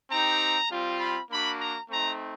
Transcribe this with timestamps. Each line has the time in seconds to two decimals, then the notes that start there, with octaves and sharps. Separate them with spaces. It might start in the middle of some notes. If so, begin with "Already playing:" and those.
0.11 C4 D#4 G4 A#5
0.70 G3 C4 F4
1.00 B5
1.30 A#3 D4 F#4 B5
1.60 A#5
1.90 A3 C4 D#4 A#5